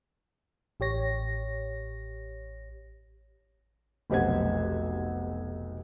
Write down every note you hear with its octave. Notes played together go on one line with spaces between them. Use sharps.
A1 G4 C#5 A#6
F1 B1 G4 C5 F#5 G#6